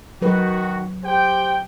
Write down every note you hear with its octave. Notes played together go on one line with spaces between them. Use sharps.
D#3 F#3 F#4 B4
G4 C5 G5